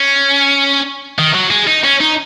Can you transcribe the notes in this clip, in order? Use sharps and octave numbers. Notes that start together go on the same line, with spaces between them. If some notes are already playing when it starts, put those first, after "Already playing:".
Already playing: C#4
D#3
F#3
G#3
D#4
C#4
D#4